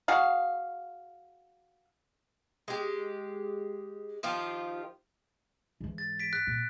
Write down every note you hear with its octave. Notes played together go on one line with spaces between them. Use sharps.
F#4 G#4 F5
G#3 G4
D#3 F3 F4 G4
G#2 E3
A6
B6 D7
F#6 B6
A#2